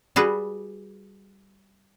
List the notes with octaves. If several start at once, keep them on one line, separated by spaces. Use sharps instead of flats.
G3 F#4 G#4 B4